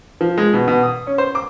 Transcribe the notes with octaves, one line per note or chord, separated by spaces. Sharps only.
F3
G#3
B2
B2
D#6
C#4
C5
D6